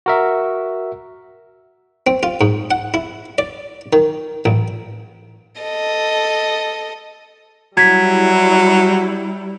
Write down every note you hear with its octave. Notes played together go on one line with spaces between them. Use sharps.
F#4 A#4 E5
C4
F4
G#2
F#5
E4
D5
D#3
A1
A4 D#5
F#3 G3 E4 G#6 B6